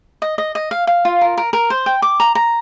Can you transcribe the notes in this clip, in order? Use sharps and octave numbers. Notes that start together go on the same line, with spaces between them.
D#5
D#5
D#5
F5
F5
F4
A#4
A#4
A#4
C5
G5
D6
A#5
A#5